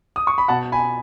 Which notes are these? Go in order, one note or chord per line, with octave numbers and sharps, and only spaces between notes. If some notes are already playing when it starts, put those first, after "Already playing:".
D#6
C#6
B5
B2 F#5 A5
G#5 B5